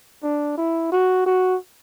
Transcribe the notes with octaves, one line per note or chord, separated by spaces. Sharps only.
D4
E4
F#4
F#4